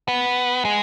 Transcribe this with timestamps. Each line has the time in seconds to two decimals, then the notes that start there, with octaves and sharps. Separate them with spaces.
0.08 B3
0.65 G#3